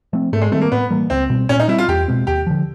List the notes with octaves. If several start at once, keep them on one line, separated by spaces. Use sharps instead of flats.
F3 A3 C4
G#2 A3
G#3
D#3 G3 A3 C4
A#3
A2 B3
E3 G3 A#3
C#2 C4
B2 G3 C4
A#2 C#4
D#4
G3 C4 E4
F4
E2 G4
B2 G#3 C4
D#2 G4
D3 F3